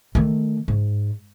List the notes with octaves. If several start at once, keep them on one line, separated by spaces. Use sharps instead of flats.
D#3 A3
G#2